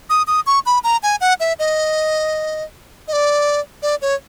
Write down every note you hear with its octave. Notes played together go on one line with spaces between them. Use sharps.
D#6
D#6
C#6
B5
A#5
G#5
F#5
E5
D#5
D#5
D5
D5
C#5